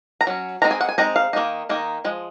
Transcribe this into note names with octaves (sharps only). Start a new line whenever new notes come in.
A#5
F#3 C#4
G#3 C4 D#4 A#5
G#5
F#5
G#5
G#3 C4 D#4 A#5
F5
D#3 A#3 D#4
D#3 A#3 D#4
F3 G#3